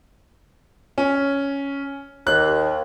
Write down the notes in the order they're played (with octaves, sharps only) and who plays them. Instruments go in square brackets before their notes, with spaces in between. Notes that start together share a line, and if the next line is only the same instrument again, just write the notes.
[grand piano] C#4
[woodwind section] D#2 [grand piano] F#6